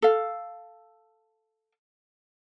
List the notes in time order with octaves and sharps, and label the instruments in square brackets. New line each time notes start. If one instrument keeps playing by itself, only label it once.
[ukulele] A4 F5